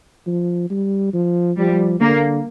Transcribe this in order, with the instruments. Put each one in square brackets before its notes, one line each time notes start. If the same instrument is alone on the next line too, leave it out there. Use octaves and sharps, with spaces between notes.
[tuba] F3
G3
F3
[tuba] F3 [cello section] G3
[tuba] D3 [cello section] A#3